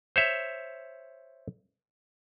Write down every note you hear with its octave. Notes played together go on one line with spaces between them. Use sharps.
C5 C#5 E5